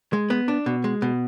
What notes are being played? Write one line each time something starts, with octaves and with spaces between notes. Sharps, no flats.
G#3
B3
D4
B2
G#3
B2